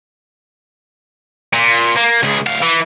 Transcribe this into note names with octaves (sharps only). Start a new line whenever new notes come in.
A#2
A#3
C#2 G#4
D2 F5
E3